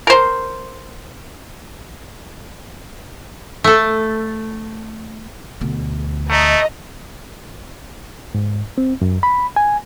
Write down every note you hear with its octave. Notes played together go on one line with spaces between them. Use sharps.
A#4 C5
A3 A4
D2 B2
A3 D#5 A#5
G#2
C4
F#2
B5
G#5